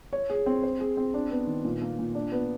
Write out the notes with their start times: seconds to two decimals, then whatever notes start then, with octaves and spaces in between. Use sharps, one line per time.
0.13 C#5
0.30 G#4
0.46 C4
0.63 C5
0.80 G#4
0.97 C4
1.14 D4
1.31 B3
1.47 D#3
1.65 A#2
1.82 A#3
1.99 A#2
2.15 D4
2.32 B3